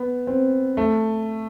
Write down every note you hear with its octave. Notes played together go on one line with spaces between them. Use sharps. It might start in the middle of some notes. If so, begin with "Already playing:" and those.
Already playing: B3
C4
A3